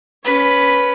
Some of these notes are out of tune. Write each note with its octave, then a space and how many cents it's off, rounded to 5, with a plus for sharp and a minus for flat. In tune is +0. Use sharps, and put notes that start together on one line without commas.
C#4 +15 B4 +0